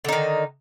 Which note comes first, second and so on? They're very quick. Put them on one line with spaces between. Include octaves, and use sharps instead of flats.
D3 D#4 D#3